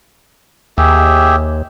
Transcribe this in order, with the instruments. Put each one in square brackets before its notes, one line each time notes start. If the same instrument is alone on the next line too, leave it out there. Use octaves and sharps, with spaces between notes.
[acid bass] D#2 [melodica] G4 G#4 E5